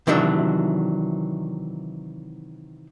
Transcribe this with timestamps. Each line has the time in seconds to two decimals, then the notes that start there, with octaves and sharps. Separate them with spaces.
0.07 C3 D#3 E3 F#3 D4